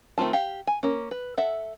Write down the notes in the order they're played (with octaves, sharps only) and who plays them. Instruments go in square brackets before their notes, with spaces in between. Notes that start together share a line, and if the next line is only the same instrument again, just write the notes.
[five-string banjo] D#3 A3 C4 F4 A5
G4 F5
G#5
A#3 C#4
B4
A4 E5 F#5